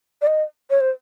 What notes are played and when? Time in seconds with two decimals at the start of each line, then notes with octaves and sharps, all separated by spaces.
0.22 D5
0.27 D#5
0.70 C#5
0.80 C5